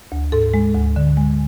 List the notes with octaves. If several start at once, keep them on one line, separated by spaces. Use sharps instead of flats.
D2
G#2 A4
G#3
D2
D3
G#3